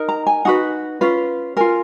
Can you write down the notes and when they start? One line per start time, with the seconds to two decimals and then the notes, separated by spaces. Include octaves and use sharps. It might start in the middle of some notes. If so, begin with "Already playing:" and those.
Already playing: D#4 A#4
0.09 A#5
0.27 G#5
0.45 D#4 F#4 B4 F#5
1.01 C#4 F4 B4
1.57 F4 A#4 G#5